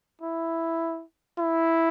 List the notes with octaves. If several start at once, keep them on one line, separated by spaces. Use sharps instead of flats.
E4
E4